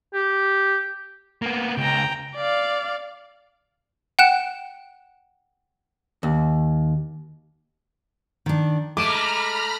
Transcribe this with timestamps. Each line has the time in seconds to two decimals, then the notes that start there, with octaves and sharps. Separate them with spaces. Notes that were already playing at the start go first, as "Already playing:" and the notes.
0.14 G4
1.42 A#3 B3
1.78 C#2 G5 A#5
2.36 D5 F5
4.19 F#5 G5 F#6 E7
6.23 D#2
8.46 D#3 D4
8.97 G#3 A3 A#5 B5 D6 F6 D7 D#7